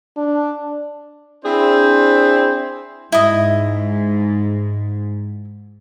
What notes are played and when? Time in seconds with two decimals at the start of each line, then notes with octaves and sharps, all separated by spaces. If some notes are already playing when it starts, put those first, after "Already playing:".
0.17 D4
1.45 C4 D4 E4 G#4 C5
3.12 G#2 E4 D#5